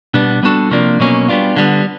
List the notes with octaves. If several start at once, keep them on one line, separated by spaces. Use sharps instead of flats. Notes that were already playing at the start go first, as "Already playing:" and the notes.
B2 G3 B3 D4
G3 B3 D4 F#4 A4
C3 F3 A#3 D4
B2 F#3 A#3 C#4
G3 B3 D4 F4
D3 G3 B3